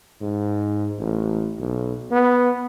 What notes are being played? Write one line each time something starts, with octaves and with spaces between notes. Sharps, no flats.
G#2
A1
B1
B3